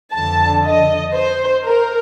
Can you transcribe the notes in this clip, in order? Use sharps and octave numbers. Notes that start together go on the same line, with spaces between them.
F2 D3 F3 A5
D#5
C5
A#4